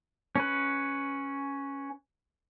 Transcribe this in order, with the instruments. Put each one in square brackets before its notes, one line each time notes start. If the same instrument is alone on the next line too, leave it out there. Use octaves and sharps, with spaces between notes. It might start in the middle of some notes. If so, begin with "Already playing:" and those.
[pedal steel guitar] C#4 B4